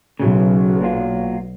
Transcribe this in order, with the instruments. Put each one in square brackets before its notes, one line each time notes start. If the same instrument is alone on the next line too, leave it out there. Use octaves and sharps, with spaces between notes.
[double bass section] B1 [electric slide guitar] C#3 F#3 E4
[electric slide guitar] A#2 F#3 F4